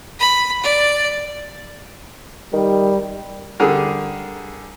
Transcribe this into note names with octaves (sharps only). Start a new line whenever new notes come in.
B5
D5
D#3 G3
D3 G3 G#4 A#4